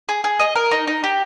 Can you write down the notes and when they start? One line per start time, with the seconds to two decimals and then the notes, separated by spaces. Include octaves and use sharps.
0.09 G#4
0.24 G#4
0.39 D#5
0.55 A#4
0.71 D#4
0.87 D#4
1.04 G4